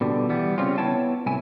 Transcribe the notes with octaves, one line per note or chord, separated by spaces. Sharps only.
B2 D3 G3
E3 G3 B3
C#3 G3 C4 C#4 F4
B3 E4 C#5 G5 A5
C2 E4 G#5